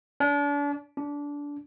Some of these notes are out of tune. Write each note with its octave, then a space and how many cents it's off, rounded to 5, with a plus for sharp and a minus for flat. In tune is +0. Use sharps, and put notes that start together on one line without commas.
D4 -35
D4 -20